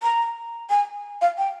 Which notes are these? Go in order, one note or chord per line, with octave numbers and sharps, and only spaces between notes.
A#5
G#5
F5
G5